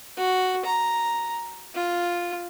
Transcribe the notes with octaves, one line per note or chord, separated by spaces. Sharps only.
F#4
A#5
F4